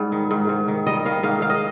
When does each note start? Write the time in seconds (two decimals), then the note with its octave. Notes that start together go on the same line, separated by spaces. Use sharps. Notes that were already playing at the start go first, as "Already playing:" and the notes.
Already playing: G#2 G3
0.12 D#3
0.31 G#2
0.49 G#2
0.68 D#3
0.87 G3 D#5
1.05 D#3 F5
1.23 G#2 F5
1.42 G#2 F5
1.50 D#5